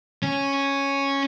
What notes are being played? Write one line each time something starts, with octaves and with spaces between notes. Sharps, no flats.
C#4